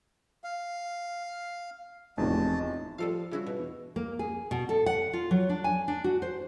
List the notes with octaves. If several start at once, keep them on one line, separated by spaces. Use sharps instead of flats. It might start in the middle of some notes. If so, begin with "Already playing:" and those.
F5
F1 E2 A2 G#3 A5
F3 G3 A4 F5
G2 C#3 E4 F#4
B2
E2
A#3
G#4
B2
A4
F#5
F4
F#3
D4
G#5
D4
F#4
C5